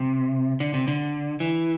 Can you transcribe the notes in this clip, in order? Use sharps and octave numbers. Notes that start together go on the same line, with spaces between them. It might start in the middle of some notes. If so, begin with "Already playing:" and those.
Already playing: C3
D3
C3
D3
E3